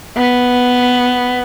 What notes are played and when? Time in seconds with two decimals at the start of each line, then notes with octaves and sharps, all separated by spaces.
0.17 B3